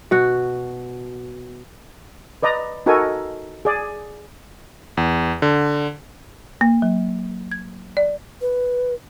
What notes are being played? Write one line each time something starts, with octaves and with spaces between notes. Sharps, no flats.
B2 F#4 F#5
B4 D5 D#5 A#5
D#4 F#4 A4 A#4 G#5
G#4 D5
E2
D3
A#3
F#3
G#6
D5
B4